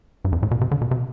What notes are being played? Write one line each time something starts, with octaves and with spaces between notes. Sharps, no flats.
G2
F2
A2
B2
C3
D3
B2
C3